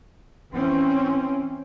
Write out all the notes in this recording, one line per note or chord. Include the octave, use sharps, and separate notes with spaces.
E3 C4 C#4